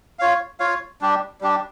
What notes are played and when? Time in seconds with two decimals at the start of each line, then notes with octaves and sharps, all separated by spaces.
0.19 F4 C#5 F5
0.60 F4 C#5 F5
1.01 G3 D4 G4
1.41 G3 D4 G4